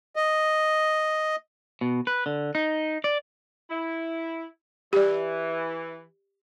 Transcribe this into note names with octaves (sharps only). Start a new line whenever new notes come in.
D#5
B2
B4
D3
D#4
D5
E4
E3 G4 D5